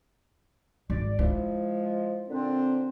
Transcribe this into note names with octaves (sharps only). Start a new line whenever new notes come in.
G#1 D5
F3 G#3 E4
A#2 D3 C4 D4